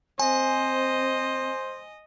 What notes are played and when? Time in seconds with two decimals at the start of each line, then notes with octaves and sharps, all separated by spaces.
0.19 C4 C5 D#5 G#5